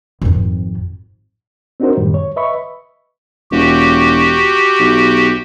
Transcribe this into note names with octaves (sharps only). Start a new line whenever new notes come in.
G#1 F2
C4 D4 D#4 F#4 A#4 C5
F#2 A2 D#3 G3
C#5
B4 D#5 E5 B5 C#6
E1 F#4 G4
B1